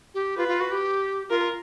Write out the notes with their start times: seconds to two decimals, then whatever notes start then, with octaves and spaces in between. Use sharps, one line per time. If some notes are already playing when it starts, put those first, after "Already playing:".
0.14 G4
0.37 F4 B4
0.48 F4
0.60 F#4
0.71 G4
1.29 F4 A#4